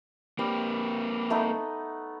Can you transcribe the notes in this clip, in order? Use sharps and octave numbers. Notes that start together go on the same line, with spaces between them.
G3 A#3 C4
A3 B3 D#4